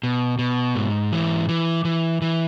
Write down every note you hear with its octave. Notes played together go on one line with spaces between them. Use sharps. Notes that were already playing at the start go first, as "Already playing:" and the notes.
B2
B2
G#2
E3
E3
E3
E3